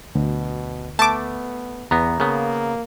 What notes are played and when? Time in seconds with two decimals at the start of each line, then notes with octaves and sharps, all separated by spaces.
0.15 D2 B2
0.99 A3 B3 A5 D6
1.91 E2 B3 A#5
2.20 C#3 A#3 B3